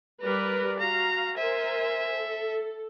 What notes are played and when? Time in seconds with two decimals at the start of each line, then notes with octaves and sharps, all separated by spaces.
0.22 G3 A#4 B4 D5
0.79 F#4 F5 A#5
1.38 A#4 C5 E5 G#5
2.14 A4